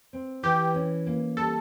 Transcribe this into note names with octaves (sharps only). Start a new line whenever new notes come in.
C4
E3 G4
C#4
A#3
G3 A4